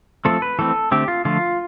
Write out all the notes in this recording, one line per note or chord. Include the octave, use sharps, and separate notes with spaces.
F3 A3 C4 A4
B4
E3 A3 C4 A4
D3 A3 C4 G4
F4
D3 F3 A3 F4